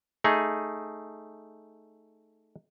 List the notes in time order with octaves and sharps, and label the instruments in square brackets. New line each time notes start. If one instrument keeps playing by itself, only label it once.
[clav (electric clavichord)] A3 D#4 G#4